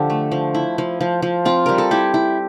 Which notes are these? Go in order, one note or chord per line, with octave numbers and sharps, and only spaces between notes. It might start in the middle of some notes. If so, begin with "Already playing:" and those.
Already playing: D3 F3 G4 A4
A3
F3
E4
F3
F3
F3
C4 F4
G3 A#4
A4
E4 G4
E4